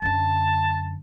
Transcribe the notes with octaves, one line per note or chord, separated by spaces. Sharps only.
F#2 D3 A5